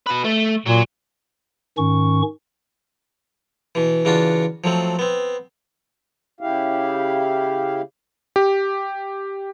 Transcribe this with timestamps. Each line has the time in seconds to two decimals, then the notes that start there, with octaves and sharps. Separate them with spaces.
0.06 F#4 B4
0.24 A3
0.66 A#2 F#3
1.78 G#2 D#3 C#4 C#6
3.75 B2 E3
4.05 C#3 E3 D4 F4 F#4
4.64 F3 F#3 A3 C4
4.99 B3 C4
6.41 C#3 E4 G4 F5
8.36 G4